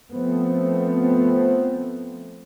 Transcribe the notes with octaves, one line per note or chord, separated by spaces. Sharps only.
F3 A3 B3 C4